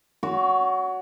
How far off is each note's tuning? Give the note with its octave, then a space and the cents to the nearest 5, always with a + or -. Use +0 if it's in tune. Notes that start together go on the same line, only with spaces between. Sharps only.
F#4 +0 C#5 +30